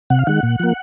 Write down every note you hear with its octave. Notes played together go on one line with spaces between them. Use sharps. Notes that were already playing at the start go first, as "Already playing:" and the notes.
C3 F#5
F5
D#3 G#3 F#5
A#2
F3 A#3